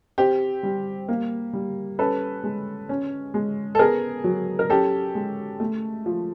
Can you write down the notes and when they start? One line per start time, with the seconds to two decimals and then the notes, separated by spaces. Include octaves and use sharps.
0.18 C4 G4
0.63 G3
1.09 A#3
1.53 G3
1.99 C#4 A4 B4
2.44 G#3
2.89 C#4
3.34 G#3
3.75 A4
3.79 B3 G#4 A#4
4.24 F#3
4.59 A#4
4.69 C#4 G4 A4
5.15 G#3
5.60 A3
6.06 F3